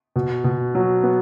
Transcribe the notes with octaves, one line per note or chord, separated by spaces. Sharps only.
B2
B2
F#3
B3